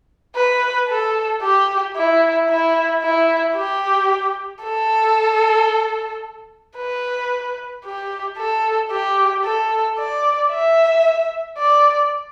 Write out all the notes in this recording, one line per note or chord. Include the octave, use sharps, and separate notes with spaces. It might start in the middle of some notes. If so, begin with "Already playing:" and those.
B4
A4
G4
E4
E4
E4
G4
A4
B4
G4
A4
G4
A4
D5
E5
D5